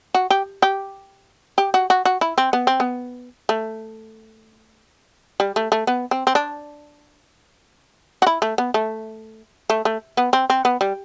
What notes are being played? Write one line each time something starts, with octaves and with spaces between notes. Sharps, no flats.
F#4
G4
G4
G4
F#4
F#4
F#4
E4
C4
B3
C4
B3
A3
G3
A3
A3
B3
C4
C4
D4
F#4
E4
A3
B3
A3
A3
A3
B3
C4
C4
B3
G3